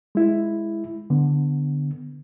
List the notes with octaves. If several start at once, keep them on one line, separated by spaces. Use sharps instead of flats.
G#3 E4
D3 B3